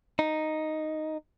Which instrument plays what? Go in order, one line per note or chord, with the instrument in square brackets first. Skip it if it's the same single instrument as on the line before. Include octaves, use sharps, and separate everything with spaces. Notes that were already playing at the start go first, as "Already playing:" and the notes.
[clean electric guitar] D#4